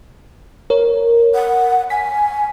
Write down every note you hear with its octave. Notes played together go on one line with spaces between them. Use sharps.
A#4 C#5
F#5
G#5 B6